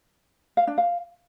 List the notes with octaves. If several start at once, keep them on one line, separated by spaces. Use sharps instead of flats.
F5
D4
F5